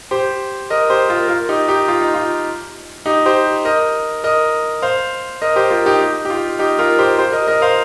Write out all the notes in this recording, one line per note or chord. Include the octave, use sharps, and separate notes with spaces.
G4 C5
A#4 D#5
G4 C5
F4 A#4
F4 A#4
D#4 G4
D#4 G4
F4
D#4
F4
D#4 G4
G4 C5
A#4 D#5
A#4 D#5
C5 F5
A#4 D#5
G4 C5
F4 A#4
D#4 G4
D#4
G4
F4
D#4 G4
F4 A#4
G4 C5
G4 C5
A#4 D#5
A#4 D#5
C5 F5